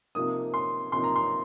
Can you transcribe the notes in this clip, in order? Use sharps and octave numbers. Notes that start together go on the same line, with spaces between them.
C3 F3 A#3 D#4 D#6
C6
C3 F3 A#3 D#4 C6
A#5
C6